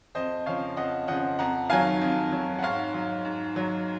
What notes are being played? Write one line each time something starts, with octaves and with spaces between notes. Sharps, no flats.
F2 C5 D#5
C#3 F3 C#5 F5
F2 D#5 F#5
C#3 F3 D#5 F#5
F2 F#5 A#5
D#3 F#3 F5 G#5
F2
D#3 F#3
F#5
G#2 C#5 F5
F#3
G#2
F#3